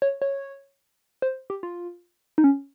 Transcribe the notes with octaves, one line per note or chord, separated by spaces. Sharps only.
C#5
C#5
C5
G4
F4
D#4
C#4